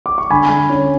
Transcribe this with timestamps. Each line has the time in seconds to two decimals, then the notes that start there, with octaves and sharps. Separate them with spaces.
0.06 D6
0.18 C#6
0.30 D3 G#5 B5
0.50 D3
0.69 C#4